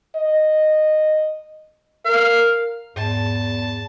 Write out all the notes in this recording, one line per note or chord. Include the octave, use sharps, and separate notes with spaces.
D#5
A#4 F5
E2 G#2 A5